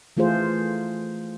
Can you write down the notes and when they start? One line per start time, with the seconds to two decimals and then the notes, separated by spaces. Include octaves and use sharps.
0.17 E3 A3 F4 G#4 C5